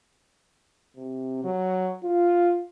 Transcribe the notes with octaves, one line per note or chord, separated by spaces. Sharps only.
C3
F#3
F4